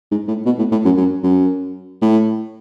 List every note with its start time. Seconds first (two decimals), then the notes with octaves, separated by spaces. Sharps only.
0.11 G#2
0.28 A2
0.46 B2
0.58 A2
0.72 A2
0.85 F#2
0.97 F#2
1.23 F#2
2.02 A2